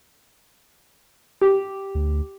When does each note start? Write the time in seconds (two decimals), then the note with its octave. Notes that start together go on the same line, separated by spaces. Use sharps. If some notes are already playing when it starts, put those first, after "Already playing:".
1.41 G4
1.95 D2